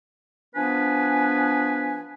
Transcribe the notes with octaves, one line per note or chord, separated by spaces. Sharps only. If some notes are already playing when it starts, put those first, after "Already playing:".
F3 B3 D4 B4 G#5